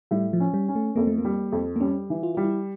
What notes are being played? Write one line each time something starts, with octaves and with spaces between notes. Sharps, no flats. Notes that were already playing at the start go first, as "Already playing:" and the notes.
A2 G3
F3
C#4
G3
C#4
A3
F2 A#3
A3
A#3
G3
F2
A#3
G3 C#4
E3
F4
G3 F4
E4